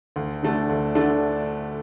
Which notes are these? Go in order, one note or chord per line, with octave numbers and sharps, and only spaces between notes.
D2
D3 A3 D4
D2
D3 A3 D4